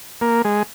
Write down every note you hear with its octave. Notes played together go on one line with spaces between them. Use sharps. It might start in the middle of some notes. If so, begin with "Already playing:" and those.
A#3
G#3